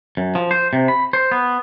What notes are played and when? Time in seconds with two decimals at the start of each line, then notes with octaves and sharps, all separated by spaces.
0.17 F#2
0.35 F3
0.51 C5
0.73 C3
0.88 B5
1.13 C5
1.32 B3